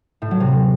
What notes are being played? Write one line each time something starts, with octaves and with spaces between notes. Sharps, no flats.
A2
F#3
C3